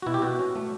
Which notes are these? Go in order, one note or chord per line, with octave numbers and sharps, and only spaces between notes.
F#4
B2 E4
G4
B2 F#4
C#4
A3